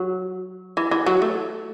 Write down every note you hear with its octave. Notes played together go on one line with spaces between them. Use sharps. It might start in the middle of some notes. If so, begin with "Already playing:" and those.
Already playing: F#3
E3
E3
F#3
A3